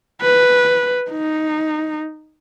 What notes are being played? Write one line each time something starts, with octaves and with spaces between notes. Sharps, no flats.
B4
D#4